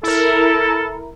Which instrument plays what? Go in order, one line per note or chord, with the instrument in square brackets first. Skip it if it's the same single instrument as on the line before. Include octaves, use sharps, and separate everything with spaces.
[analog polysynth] E4 A#4 [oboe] A4